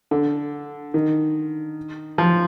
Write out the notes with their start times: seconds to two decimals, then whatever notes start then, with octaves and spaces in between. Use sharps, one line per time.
0.11 D3
0.94 D#3
2.18 F3